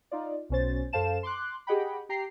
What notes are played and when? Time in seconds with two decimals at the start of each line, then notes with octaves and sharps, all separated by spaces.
0.11 D#4 F4 D5
0.49 B1 B2 C#4 C5 A6
0.93 F#2 A4 C5 F5 A5 E7
1.23 C6 D6 F#6
1.67 G4 G#4 D#5 F#5 G5 B5
2.09 G4 G5 A#5 C7